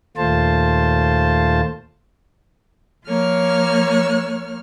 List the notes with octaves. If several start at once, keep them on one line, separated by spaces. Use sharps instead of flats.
D#2 A#2 A3 F4 C5 A5
F3 A#3 C#5 F6